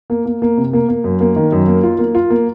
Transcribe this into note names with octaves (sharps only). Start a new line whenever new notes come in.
A#3
A#3
A#3
C3
A#3
A#3
F#2
A#3
D#3
F#2
A#3
F4
A#3
F4
A#3